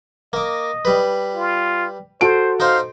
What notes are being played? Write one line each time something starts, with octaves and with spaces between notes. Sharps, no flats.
A#3 D#5 D6
G3 B4
F4
F#4 A4 C5 D7
D#4 C5 F5